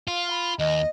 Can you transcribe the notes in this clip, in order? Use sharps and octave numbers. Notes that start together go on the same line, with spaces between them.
F4 F5
B5
D#2 D#5